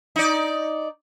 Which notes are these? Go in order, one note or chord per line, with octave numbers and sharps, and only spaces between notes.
D#4 D5